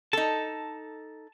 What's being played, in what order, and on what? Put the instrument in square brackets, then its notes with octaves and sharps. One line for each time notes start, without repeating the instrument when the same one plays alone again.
[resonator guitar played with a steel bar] D#4 A4 [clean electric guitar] A5